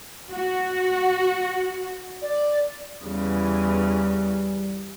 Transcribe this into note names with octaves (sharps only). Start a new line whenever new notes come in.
F#4
D5
E2 C#3 E3 G3